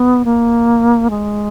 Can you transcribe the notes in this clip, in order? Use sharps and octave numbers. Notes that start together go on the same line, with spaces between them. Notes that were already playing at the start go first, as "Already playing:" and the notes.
Already playing: B3
A#3
G#3